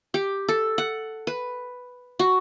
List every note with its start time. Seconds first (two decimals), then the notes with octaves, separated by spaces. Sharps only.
0.14 G4
0.48 A4
0.78 F#5
1.27 B4
2.19 F#4